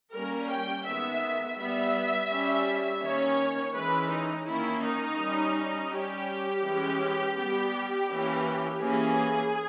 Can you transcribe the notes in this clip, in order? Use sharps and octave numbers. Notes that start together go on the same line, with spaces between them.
G3 A#3 C#4 A#4
G5
D#3 G#3 B3 E5
G3 B3 E5
G3 C#4
D#3 A#3 C#4 C#5
E3 G#3 C#4 B4
D#4
D#3 A#3 C#4 E4
D#4
G3 C#4
G3 C#4 G4
E3 G#3 C#4
G3 B3
E3 A#3 C#4
E3 A#3 C#4 G#4